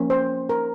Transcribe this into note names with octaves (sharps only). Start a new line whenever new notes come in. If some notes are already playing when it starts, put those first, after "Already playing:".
Already playing: F3 A#3 C#4
C5
A#4